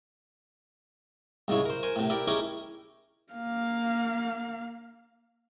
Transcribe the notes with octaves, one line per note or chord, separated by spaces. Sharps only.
C2 G#2 C#3 E4 C#5
A#4 C5
A#4 C5 G#5
A2 C3
E4 G4 A#4 D5
C#4 D#4 E4 G4 G#4 A#4
A#3 F5